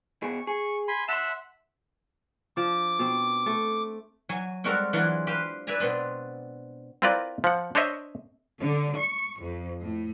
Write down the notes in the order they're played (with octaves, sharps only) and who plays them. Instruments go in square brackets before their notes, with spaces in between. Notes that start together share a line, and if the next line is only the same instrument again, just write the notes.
[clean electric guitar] B2 G#4 [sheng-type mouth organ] C#6
[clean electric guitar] G#4 [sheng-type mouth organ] C#6
[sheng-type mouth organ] G#5 B5 C6
[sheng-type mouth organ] E5 F#5 E6 [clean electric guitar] A5 C6
[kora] F3 D4 [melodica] D6
[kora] B2 C4
A3
[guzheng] F#3 G#5
G3 G#3 C4 F#4 A4 A#4
E3 F#3 D4 F4 G#4 F#5
G4 B4 C5 F5
B4 D5 E5 G#5 A#5
B2 B3 C4 D4
[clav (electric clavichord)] C4 E4 F4 A#4 B4 D5
F3 F#5
D4 C5 C#5 D#5 E5
[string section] D3
C#6
F2
A2